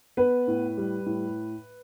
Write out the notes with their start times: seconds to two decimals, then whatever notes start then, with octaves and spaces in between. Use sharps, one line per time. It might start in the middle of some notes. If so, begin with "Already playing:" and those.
0.17 B3 B4
0.48 A2
0.77 G3
1.06 A2